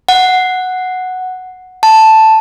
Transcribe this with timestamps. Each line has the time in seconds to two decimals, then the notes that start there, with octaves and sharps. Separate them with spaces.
0.09 F#5
1.83 A5